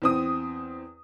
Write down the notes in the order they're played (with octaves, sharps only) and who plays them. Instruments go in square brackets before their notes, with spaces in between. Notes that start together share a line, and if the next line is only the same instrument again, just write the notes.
[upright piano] E2 C4 D#6